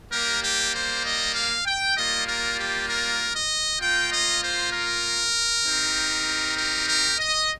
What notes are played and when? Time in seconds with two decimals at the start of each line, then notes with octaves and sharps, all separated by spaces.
0.11 G3 A#3 G4 A#4
0.42 G4
0.74 C5
1.03 D#5
1.34 F5
1.66 G5
1.96 G3 A#3 F4 D#5
2.26 A#4
2.58 G4
2.88 A#4
3.34 D#5
3.80 A#3 F4 G5
4.12 D#5
4.42 C5
4.72 A#4
5.64 C4 D#4 G4
6.57 A#4
6.88 A#4
7.19 D#5